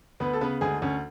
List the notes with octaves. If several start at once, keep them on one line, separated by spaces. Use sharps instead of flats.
D2 B3 B4
A4
C#3 B3 B4
D2 G#3 G#4
D2 C#4